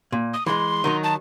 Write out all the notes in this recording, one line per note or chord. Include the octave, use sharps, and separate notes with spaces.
A#2
D#6
E3 G#3 C6
D#3 F#3 D#4
A5